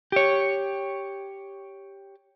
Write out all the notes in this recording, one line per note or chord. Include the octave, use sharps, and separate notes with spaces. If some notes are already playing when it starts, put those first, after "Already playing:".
G4 C#5